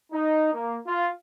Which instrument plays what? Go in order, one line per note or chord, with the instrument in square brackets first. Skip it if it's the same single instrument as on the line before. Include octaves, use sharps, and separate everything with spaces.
[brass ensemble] D#4
A#3
F4